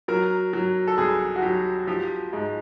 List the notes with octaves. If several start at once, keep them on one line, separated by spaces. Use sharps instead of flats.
F#3 A#4
F#3
A4
C2 G#4
F#4
F#3 G4
F3 G4
G#2